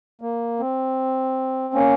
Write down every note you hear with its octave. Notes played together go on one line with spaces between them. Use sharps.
A#3
C4
A#3 C#4